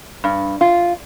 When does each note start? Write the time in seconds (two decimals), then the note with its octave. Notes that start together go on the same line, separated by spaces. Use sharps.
0.24 G2
0.61 F4